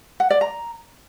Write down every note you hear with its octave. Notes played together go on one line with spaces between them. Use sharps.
F#5
D5
A#5